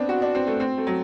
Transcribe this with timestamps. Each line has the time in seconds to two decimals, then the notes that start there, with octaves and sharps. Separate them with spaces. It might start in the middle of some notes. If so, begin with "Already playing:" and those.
Already playing: B3 C4 D4
0.09 F#4
0.22 D4
0.35 C4
0.47 A3
0.60 C4
0.78 A3
0.87 F#3